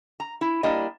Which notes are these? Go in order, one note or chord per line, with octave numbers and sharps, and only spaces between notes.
A#5
E4
G3 A#3 D4 E4 D#5